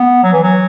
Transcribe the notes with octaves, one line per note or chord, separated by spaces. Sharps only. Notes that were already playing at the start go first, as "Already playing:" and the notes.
Already playing: B3
F#3
E3
F#3